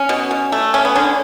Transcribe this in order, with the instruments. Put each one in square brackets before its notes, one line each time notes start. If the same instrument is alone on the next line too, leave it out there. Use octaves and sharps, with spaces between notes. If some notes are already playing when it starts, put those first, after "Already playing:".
Already playing: [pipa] C#4
B2
B2
A3
A3 C#4
B3
D3 C#4